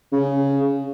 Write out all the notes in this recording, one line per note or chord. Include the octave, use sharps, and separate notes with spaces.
C#3